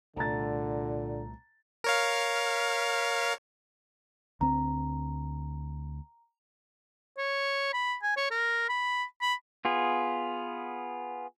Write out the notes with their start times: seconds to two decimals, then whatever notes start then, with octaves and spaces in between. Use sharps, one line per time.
0.16 C2 A#2 D3 A3 A5 A#5 A6
1.84 A#4 C#5 F5
4.41 D2 C4 A#5
7.18 C#5
7.73 B5
8.02 G#5
8.17 C#5
8.31 A#4
8.69 B5
9.22 B5
9.65 B3 F4 G#4